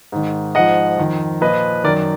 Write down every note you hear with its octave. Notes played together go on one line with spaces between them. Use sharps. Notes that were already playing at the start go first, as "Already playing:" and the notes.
G#2 D#3
G#2 F3 D#5 F#5
F2 D#3
A#2 F3 B4 D#5
F#2 D#3 A#4 D5